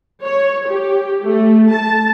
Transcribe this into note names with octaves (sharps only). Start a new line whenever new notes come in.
C#5
G4
A3
A5